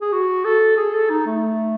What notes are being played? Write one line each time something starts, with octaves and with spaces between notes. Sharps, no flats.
G#4
F#4
A4
G#4
A4
D#4
A3